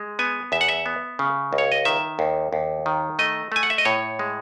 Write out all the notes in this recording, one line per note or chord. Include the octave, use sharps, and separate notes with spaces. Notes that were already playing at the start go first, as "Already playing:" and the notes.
Already playing: G#3
B3 G#5
E2 E5
F#5
E5
B3
C#3
C#2
C#5
D#5
D#3 E5
D#2
D#2
D#3
A3 D#5
A3 G#5
F#5
E5
D#5
A2 C#5
G#3